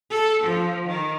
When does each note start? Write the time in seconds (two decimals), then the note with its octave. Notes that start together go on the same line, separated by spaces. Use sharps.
0.10 A4
0.44 F3
0.87 D#3